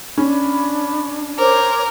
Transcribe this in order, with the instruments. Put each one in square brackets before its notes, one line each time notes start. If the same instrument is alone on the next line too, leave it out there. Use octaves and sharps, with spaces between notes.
[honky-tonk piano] C#4 [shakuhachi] D4 [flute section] B5
[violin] A#4 [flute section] C5 C#5 D6